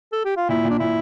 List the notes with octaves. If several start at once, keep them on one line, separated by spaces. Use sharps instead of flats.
A4
G4
F4
A#2 E4
A#2
D4
A#2 E4